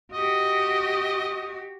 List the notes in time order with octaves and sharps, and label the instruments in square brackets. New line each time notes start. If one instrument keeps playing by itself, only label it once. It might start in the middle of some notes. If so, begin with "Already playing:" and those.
[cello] F#4 G4 [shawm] D#5